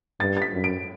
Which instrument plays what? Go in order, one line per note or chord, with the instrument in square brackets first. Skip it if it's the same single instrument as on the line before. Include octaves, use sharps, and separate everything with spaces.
[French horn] G2 [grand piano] A6
[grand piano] A6
B6
[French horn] F#2
[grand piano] D7